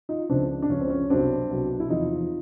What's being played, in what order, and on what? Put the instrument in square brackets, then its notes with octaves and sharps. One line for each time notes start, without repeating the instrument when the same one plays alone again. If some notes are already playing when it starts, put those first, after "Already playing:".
[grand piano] D#4 F4
C#2 C#3 F3 C4 D4
D4
C#2 C#3 F3 C#4
C4
C#4
C2 B2 F#3 C4 D4
C2 B2 F#3
E4
E2 C3 F3 D#4 F4